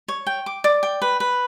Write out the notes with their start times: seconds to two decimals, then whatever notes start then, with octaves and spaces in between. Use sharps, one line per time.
0.08 C#5
0.27 G5
0.46 D6
0.64 D5
0.83 G5
1.02 B4
1.20 B4